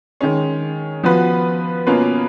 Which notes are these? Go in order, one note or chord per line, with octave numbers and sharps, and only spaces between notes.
D#3 G#3 C#4
F3 B3 F#4 B4
B2 A#3 C#4 F4 B4